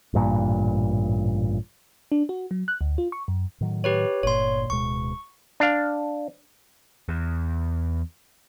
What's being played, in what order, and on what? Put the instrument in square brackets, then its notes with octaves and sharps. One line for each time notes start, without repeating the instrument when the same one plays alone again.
[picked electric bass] A1 G2 A#2
[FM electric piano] D4
F#4
F#3
F#6
D2
F4
C#6
F#2
[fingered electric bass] A2 D#3 F#3
[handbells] G4 B4 C#5
[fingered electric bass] G1 A#2 [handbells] C#5 C6
[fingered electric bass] D1 B2 G#3 [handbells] C#6
[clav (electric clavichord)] D4 F5
[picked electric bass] E2